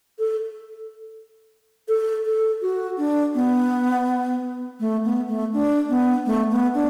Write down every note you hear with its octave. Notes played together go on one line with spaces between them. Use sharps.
A4
A4
A4
F#4
D4
B3
A3
B3
A3
D4
B3
A3
B3
D4